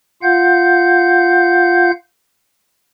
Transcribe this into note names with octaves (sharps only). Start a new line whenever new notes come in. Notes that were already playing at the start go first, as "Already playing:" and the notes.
F4 F5 F#5 G6